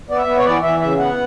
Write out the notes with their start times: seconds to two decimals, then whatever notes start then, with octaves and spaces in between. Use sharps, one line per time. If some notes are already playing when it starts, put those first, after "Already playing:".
0.09 B3 D5
0.18 E5
0.26 B3
0.37 C#5
0.45 E3 D5
0.63 E3 E5
0.81 C#3 E5
0.99 B3 F#5